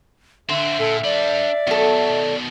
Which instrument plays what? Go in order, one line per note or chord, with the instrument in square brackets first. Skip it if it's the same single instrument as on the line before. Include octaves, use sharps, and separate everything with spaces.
[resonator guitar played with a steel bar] D3 [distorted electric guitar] C4 F#4 [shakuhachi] E5
[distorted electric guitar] A#2 [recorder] A4
[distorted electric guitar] D4 B5 [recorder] D5
[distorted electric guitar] B2 D#3 [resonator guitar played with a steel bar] F#3 A4